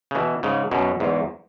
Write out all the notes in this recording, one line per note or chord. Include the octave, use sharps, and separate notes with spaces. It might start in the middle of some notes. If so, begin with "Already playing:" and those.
C#3
B2 E3
G#2 C#3
F#2 B2
E2 G#2